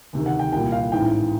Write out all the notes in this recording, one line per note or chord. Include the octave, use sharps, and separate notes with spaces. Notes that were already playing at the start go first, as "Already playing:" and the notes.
D2 C3 D#3
F#5
G5
C2 A#2 G5
F5
A1 G#2 E3 G5